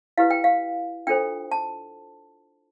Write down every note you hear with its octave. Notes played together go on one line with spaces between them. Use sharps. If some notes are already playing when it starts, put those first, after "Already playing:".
E4 G4 B4 F5
G5
F5
D4 F4 A4 C5 G5
A5